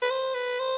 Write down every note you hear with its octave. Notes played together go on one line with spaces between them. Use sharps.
B4
C5
B4
C5